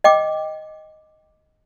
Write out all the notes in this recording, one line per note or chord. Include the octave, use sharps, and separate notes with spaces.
D#5 G5 D6